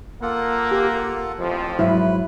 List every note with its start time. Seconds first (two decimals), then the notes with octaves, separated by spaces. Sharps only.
0.22 A#3 F4 A4 F#5
0.71 G4
1.39 A1 F2 F3
1.79 G#2 F#3 E4 B4